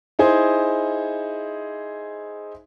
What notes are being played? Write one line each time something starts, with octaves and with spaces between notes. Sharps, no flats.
D#4 E4 G#4 C5